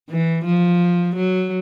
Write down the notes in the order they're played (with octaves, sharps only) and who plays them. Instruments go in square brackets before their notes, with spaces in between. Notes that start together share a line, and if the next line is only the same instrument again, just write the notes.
[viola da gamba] E3
F3
F#3